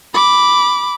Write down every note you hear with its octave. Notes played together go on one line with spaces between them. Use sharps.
B5 D6